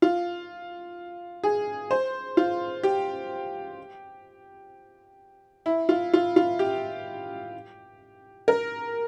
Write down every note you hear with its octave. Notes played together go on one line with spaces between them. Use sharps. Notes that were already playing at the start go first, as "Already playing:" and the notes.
F4
G#4
C5
F4
G4
E4
F4
F4
F4
G4
A#4